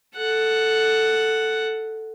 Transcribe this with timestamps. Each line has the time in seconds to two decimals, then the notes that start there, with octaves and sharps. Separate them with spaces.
0.17 A4 F#5